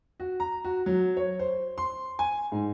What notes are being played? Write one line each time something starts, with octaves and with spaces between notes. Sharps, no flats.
F#4
A#5
F#4
F#3
C#5
C5
C6
G#5
G#2